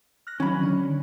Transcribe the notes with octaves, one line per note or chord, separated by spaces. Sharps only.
F6 F#6 A#6
D#3 F#3 C#4 B5
D3 D4